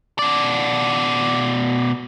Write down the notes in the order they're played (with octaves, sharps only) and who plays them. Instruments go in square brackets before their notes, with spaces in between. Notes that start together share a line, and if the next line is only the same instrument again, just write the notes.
[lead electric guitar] B2 D5